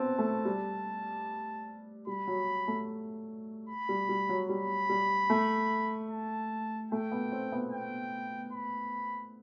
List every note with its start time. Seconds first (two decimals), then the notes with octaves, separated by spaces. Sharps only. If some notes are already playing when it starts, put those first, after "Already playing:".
Already playing: B3 C4 A5
0.18 A3
0.45 G3
2.07 G3 B5
2.27 F#3
2.68 A3
3.69 B5
3.89 G3
4.09 G3
4.29 F#3
4.49 G3 B5
4.89 G3
5.30 A3
6.10 A5
6.91 A3 G5
7.12 B3
7.32 C4
7.52 B3
7.72 G5
8.52 B5